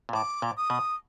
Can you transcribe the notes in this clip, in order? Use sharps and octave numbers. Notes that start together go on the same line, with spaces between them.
A#2
A2 D6
A#2
D#6
B2